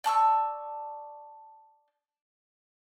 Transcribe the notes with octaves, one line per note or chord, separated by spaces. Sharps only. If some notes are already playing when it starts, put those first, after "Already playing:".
D5 A5 C#6 E6